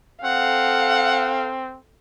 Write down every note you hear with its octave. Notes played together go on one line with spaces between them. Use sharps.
C4 A4 F5 F#5